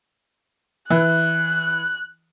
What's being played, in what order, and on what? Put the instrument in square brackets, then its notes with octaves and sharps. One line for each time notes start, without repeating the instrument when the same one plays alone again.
[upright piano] E3 [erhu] F#6